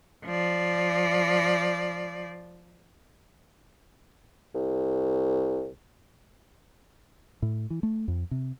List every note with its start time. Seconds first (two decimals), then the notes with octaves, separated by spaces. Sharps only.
0.26 F3 D5
4.55 C2
7.42 A2
7.70 E3
7.83 A3
8.08 F2
8.31 C3